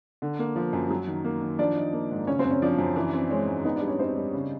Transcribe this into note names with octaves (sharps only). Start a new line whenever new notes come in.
D3
A#3
F3
F#2
F#3
D#3
A#3
D#3
F3 D4 D5
D#4
A#3
G#2
C#3 C#4 C#5
C4 C5
F#2
C#4 C#5
F3 D4 D5
F#2
E3
C4
G#3 C#4 C#5
G#2
B3 D#4 D#5
D4 D5
G3
C#4 C#5
C4 D#4 C5
G3
C#3